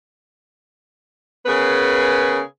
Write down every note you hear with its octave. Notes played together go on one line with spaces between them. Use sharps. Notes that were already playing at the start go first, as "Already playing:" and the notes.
C#3 B3 G#4 A#4 B4